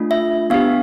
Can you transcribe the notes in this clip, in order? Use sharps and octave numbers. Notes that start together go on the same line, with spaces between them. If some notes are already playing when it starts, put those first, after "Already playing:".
Already playing: A3 D4 F4
E5
B3 D4 G4 F5